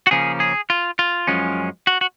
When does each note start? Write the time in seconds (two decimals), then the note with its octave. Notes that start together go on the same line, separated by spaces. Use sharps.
0.07 F#4
0.11 C#3 F3 A#3 C#4 G#4
0.40 G#4
0.70 F4
0.99 F4
1.27 F#2 F3 G#3 C#4
1.87 F#4
2.01 F#4